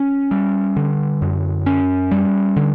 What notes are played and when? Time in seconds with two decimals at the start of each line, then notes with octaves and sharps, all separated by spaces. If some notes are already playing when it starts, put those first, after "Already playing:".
Already playing: C#4
0.31 G3
0.77 D3
1.22 F#2
1.66 C#4
2.11 G3
2.57 D3